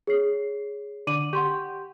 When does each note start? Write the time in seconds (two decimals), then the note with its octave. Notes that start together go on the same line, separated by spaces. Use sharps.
0.07 G#4 C#5 C7
1.07 D3 D6 D#7 F#7
1.33 G4 F#5 C6 C#6